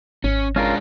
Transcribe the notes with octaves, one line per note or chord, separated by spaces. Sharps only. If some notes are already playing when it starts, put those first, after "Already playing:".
G#1 C#4
G#3 C#4 D4 F4 A#4